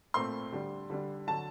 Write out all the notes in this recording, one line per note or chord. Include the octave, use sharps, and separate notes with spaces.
A#2 A3 C4 C6
D3 G3 D4
D3 G3 D4
D3 F#3 A5